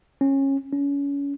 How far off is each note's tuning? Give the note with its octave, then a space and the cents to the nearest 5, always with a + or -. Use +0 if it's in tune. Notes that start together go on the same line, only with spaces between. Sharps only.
C#4 -20
C#4 +30